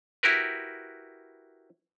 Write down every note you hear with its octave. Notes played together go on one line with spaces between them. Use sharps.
E4 F#4 G4 A#4 B4